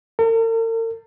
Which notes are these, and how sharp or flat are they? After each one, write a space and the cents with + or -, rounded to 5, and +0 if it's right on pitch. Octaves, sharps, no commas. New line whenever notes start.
A#4 -45